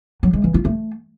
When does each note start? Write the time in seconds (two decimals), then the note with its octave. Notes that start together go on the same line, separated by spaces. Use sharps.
0.23 F#3
0.33 G#3
0.44 E3
0.54 F4
0.65 A3